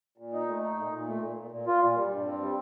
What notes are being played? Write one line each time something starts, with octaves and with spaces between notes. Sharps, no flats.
A#2
D#4
A3
D#4
A#2
A#2
A3
A#2
A#2
A#2
F4
A#2
G3
G2
C4
G3